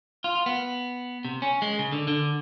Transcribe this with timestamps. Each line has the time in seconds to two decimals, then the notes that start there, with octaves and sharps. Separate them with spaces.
0.24 F4
0.46 B3
1.25 C3
1.42 C#4
1.62 G#3
1.79 C#3
1.92 D3
2.08 D3